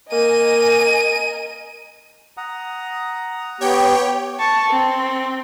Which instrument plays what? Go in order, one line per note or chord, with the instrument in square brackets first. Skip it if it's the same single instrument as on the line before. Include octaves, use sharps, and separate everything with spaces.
[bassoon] A#3 [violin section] A#4 D#5 G#5 [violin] D#7
[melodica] F#5 A#5 D#6
[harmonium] B3 G4 [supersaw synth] C#5 G5
[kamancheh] A5 C#6
C4